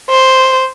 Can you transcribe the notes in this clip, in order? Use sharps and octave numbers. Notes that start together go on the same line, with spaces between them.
C5